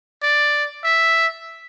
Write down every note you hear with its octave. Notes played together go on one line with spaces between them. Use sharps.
D5
E5